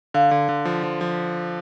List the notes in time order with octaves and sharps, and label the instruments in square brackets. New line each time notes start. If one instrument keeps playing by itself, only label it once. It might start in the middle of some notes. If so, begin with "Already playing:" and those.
[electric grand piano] D3 [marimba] F5
[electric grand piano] D3
D3
F3
F3
F3